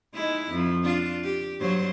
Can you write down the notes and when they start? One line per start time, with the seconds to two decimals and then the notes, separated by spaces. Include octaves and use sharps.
0.14 G#3 D#4 E4
0.52 F2 F3
0.84 D4 F4
1.24 G4
1.60 G2 F#3 C5